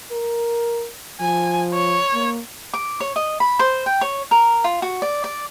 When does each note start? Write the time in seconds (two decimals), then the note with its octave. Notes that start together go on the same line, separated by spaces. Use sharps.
0.11 A#4
1.21 F3 G#5
1.74 C#5
2.13 A#3
2.74 D6
3.00 C#5
3.16 D#5
3.40 B5
3.59 C5
3.86 G5
4.01 C#5
4.31 A#4
4.64 F4
4.82 F#4
5.02 D5
5.24 D5